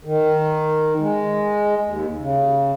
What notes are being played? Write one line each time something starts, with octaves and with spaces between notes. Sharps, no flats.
D#3
G#3
D#2
C#3